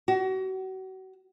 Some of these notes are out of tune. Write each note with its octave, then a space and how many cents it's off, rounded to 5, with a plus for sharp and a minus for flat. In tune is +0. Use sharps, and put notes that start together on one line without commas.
F#4 +35